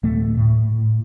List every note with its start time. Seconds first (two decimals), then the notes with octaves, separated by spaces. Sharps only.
0.03 D1 A3
0.37 A2